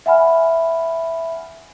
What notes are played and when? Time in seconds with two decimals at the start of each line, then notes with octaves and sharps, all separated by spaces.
0.06 E5 F#5 G#5 B5 F6